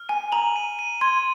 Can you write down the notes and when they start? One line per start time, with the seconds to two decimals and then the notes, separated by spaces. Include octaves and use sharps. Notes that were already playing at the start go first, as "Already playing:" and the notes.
Already playing: F6
0.09 G#5 D#7
0.32 A#5 F#7
0.56 D#7
0.79 D#7
1.01 C6 G#6